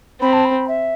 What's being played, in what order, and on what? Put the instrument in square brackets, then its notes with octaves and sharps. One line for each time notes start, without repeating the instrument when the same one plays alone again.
[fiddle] C4 [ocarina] B5
[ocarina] A5
B5
E5